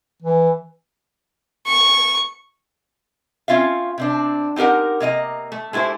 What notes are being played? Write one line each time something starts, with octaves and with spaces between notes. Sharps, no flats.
E3
C#6
C4 C#4 F4 E5 F5
C3 C4 D4
C4 D#4 G4 A#4 F#5
C3 A#3 D#5 A#5
A3
G#3 A3 E4 G4 C5